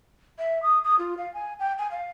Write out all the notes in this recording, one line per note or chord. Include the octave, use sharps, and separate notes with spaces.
E5
D#6
D#6
F4
F5
G#5
G5
G#5
F5